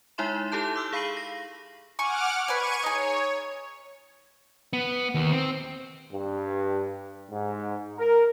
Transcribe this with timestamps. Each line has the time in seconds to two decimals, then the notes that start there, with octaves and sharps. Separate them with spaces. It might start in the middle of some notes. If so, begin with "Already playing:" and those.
0.18 G#3 D#4 E4 E5 C6 E7
0.52 E4 G4 A4 A5 G6
0.76 D6 E6 F6
0.93 G#4 F5 B5 C7 D#7 F#7
1.17 A#6
1.99 F#5 G#5 C#6 D6 F6
2.48 B4 D5 G#5 C#6 G#6 D#7
2.83 D#4 G#4 C#5
4.73 B3
5.15 D#2
5.32 C4
6.12 G2
7.31 G#2
7.98 A#4